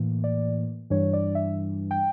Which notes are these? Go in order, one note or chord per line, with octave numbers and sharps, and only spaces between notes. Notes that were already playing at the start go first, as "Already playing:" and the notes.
Already playing: A2 E3 A#3
D5
G2 E3 G3 D4 C#5
D5
E5
G5